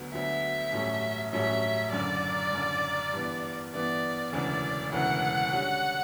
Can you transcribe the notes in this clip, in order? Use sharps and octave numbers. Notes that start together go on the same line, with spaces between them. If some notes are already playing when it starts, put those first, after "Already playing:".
Already playing: D2 D3 F#3 B3
D2 D3 F#3 B3 E5
A1 G2 F#3 A3 C#4
A1 G2 F#3 A3 C#4 E5
F#1 F#2 D3 D5
F#1 F#2 D3
G2 E3 B3
G2 E3 B3 D5
E1 D2 C#3 E3 D5
E1 D2 C#3 E3 F#5
D3 G3 C#4 F#4